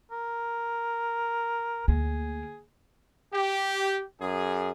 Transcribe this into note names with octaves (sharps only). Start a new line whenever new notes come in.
A#4
D2 A#3 G#4
G4
F#2 G#4